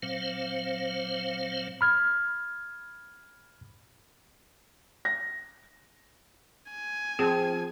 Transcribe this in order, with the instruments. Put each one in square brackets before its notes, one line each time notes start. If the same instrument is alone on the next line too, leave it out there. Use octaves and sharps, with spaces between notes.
[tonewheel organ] A#2 F#3 C4 C5 F5
[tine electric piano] B5 F6 G#6
[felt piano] A#6
[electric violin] G#5
[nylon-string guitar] F3 [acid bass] C4 [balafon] G#4